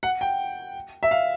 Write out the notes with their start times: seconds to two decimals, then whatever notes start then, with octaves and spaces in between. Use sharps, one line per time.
0.03 F#5
0.21 G5
1.03 E5
1.11 F5